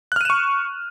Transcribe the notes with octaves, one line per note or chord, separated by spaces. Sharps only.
C#6 F6 F#6 D#7 E7